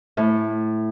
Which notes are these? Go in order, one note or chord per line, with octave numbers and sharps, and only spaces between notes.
A2